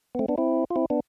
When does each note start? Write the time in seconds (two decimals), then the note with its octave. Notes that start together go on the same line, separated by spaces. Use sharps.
0.15 B3
0.19 A3 C4
0.28 B3 D4
0.38 C4 E4
0.70 F4
0.76 C4 E4
0.90 B3 D4